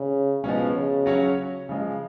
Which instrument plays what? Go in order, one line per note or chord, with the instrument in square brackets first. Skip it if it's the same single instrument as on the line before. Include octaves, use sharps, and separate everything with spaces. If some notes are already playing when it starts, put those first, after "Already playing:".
Already playing: [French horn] C#3
[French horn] B2 [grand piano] F3 G#3 C#4
[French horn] C#3
[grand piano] F#3 C#4 F#4 C#5
C#3 F3 G#3